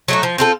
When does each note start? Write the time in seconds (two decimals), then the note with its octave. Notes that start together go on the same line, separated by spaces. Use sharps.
0.08 F#3 A3 D#4
0.23 F3
0.38 C4 F4 A4